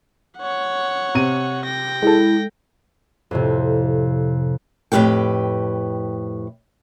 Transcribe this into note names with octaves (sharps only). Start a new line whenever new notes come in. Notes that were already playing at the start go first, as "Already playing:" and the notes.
C#5 F#5
C3 D#7
G5 A#6
G#3 E4 A4
F2 A2 C3
F2 A2 G4 B4 G5